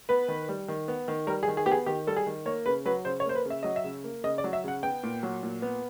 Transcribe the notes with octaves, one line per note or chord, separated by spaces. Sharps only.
B3 B4
D#3
G3
D#3
B3
D#3
G3 A#4
G#4
D#3
G#4
B3 G4
G#4
D#3 G4
G3 A4
G#4
D#3
A#3 C#5
C#3 B4
F#3 B4
C#3 C5
C#5
A#3 C5
B4
C#3
E5
F#3 D#5
E5
C#3
A#3
C#3 D#5
D5
F#3
E5
C#3 F#5
B3 G5
A#2
F#3
A#2
B3